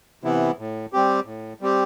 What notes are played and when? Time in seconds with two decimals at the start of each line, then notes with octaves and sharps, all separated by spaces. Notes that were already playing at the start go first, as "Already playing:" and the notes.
0.24 C3 E3 B3 E4
0.59 A2
0.93 G3 C4 G4
1.26 A2
1.61 G3 C4 G4